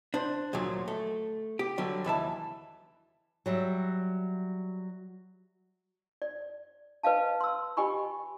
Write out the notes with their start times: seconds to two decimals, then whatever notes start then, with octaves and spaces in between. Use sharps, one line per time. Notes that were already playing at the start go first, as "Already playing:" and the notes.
0.14 D4 C5
0.53 D2 A#2 F3 F#3
0.88 A3
1.59 G4
1.78 D3 F#3 G3
2.04 D#2 E3 E5 A5
3.46 F#3 G3 E5
6.22 D5
7.03 B4 D#5 F5 A5
7.41 C6 E6
7.77 G4 D#5 G5 G#5 B5 C#6